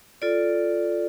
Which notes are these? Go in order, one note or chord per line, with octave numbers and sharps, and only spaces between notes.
F4 A4 D5